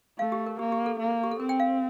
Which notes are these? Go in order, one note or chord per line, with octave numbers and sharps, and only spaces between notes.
A3 F5
G4
A#4
A#3 G4
G4
A4
A#3
G4
A4
C4 A#4
G5
F5